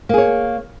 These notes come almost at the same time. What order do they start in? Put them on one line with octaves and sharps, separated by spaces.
A#3 G#4 C#5